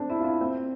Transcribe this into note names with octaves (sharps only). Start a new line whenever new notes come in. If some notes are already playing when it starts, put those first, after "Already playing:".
Already playing: A3 C4 D4
E4
F4
E4
C4